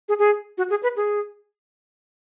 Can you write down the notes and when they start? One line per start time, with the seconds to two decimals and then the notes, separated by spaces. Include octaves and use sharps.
0.09 G#4
0.19 G#4
0.58 F#4
0.70 G#4
0.83 B4
0.97 G#4